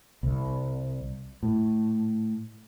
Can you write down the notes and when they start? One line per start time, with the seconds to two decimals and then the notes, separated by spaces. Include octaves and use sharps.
0.23 C2
1.43 A2